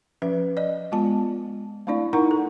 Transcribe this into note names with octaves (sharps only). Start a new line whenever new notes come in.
F3 C#4 B4 E5
D5 D#5
G#3 B3 F4 A5
A3 C4 D4 E4 D5
D#4 E4 A#4 F#5 A#5 C#6
A4